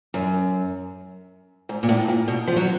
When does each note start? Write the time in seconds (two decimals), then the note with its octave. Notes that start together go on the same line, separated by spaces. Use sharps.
0.14 F#2
1.69 G#2
1.83 A#2
1.89 A2
2.08 A#2
2.28 B2
2.47 F3
2.56 F#3